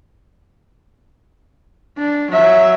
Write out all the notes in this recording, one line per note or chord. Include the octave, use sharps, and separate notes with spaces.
D4
F#3 E5